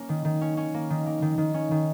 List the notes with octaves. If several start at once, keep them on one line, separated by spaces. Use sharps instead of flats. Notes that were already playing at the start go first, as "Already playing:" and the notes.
Already playing: A#3 C#4
D#3
D#3
C#4
C#4
A#3
D#3
A#3
D#3
D#3
C#4
D#3